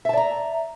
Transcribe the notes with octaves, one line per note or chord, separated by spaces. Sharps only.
D5 E5 A5 A#5